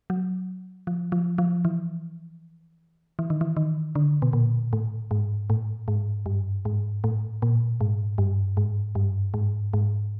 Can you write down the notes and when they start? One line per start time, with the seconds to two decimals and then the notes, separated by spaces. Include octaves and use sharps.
0.10 F#3
0.87 F3
1.12 F3
1.38 F3
1.65 E3
3.19 E3
3.30 D#3
3.41 E3
3.57 D#3
3.95 D3
4.22 B2
4.33 A#2
4.73 A2
5.11 G#2
5.50 A2
5.88 G#2
6.26 G2
6.65 G#2
7.04 A2
7.42 A#2
7.81 G#2
8.18 G2
8.57 G#2
8.95 G2
9.34 G#2
9.73 G#2